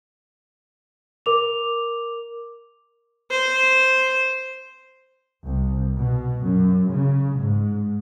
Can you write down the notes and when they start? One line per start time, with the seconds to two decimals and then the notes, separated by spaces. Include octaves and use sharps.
1.26 A#4 D6 F7
3.31 C5
5.46 C2
5.97 B2
6.44 F#2
6.89 C#3
7.38 G#2